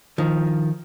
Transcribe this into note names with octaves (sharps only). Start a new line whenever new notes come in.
D#3 F3